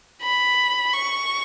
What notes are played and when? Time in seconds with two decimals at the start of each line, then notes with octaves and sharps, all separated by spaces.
0.23 B5
0.93 C#6